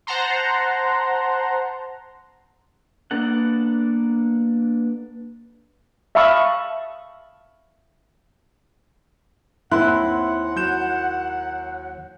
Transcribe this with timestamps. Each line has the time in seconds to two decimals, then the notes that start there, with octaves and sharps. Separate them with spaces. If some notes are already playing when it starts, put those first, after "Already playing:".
0.07 C5 F#5 A5 A#5 C6
3.11 A#3 B3 D4 A4 F#5
6.15 E5 F5 A5 B5 C#6 D#6
9.72 D#2 C4 E4 F#5 C6 F#6
10.56 F#3 G6 E7